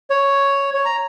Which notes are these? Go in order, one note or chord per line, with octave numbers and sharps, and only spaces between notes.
C#5
C#5
A#5